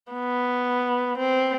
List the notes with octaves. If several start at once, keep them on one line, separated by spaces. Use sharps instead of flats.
B3
C4